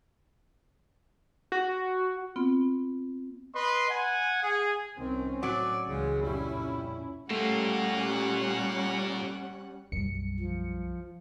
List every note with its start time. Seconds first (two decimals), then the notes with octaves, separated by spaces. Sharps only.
1.52 F#4
2.36 B3 C4 F4
3.55 B4 D#5 C6
3.89 F#5 G#5
4.43 G#4
4.98 C2 D#3 C4 C#4
5.43 A2 F#3 D5
5.88 C#2 C#3 E3 G#3
6.22 F2 A#2 G3 C#4 E4
7.30 A#2 G3 A3 A#3 C#4 F#5 E7
9.92 B1 F#2 G3 C#7
10.39 F3